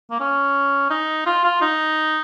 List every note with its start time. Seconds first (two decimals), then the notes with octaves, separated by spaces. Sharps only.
0.11 A#3
0.20 C#4
0.90 D#4
1.26 F4
1.44 F4
1.61 D#4